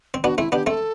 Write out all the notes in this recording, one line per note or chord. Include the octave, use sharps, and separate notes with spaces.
C4
B3 D4 F#4
A3 C4 E4
B3 D4 G4
A3 C4 A4